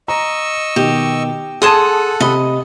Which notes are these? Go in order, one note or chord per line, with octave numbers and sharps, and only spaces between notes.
D#5 A#5 C#6 E6
B2 D#3 G4
G#4 A4 F#5 A5 C6 D#6 G#6 D#7
C3 D#5 B5